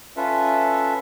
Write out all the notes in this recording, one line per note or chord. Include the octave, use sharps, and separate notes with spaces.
C#4 F4 A4 B4 E5